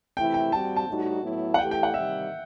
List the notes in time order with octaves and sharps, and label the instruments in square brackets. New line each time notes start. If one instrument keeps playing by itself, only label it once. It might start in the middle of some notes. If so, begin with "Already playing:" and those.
[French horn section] C3 E3 A3 E4 [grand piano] G5
[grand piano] G5
[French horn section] G3 C4 F#4 [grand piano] A5
[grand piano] A5
[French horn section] A2 G3 D#4 F#4
A2 F#3 B3 E4
[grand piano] F#5
[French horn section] E3 A3 E4 G4 [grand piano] G5
[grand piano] G5
F#5
[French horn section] C3 D#3 G3 [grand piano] E5